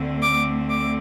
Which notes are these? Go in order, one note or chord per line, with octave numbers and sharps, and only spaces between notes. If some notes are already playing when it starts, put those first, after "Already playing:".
Already playing: D2 D3 A3 C4
D6
D6